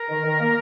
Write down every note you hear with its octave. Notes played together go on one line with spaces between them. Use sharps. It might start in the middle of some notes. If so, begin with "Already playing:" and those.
Already playing: A#4
D#3
D#3
A#3